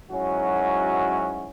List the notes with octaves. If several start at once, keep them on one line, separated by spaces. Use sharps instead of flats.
G#2 F#3 C#4 E4 F#4